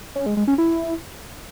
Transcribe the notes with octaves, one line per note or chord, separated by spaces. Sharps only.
C#4
G#3
G#3
C#4
E4